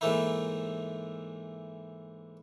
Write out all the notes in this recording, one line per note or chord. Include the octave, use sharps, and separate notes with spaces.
G#2 E3 A3 A#3 D#4 E4